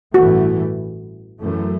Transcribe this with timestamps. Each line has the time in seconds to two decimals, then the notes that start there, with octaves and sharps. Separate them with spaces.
0.14 A1 G2 E3 A3 F#4
1.40 F#2 E3 A3